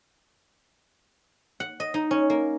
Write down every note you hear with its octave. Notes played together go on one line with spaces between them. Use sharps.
F#5
D#5
D#4
C#4
A#3